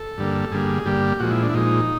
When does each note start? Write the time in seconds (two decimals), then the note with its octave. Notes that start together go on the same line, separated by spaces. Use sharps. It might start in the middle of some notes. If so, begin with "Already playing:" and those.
Already playing: A4
0.17 G2 D3 G3 A#3
0.52 G2 D3 G3 A#3 G#4
0.86 G2 D3 G3 A#3 G4
1.20 A#2 F3 G#3 F#4
1.31 E4
1.43 D4
1.50 E4
1.54 A#2 F3 G#3 D#4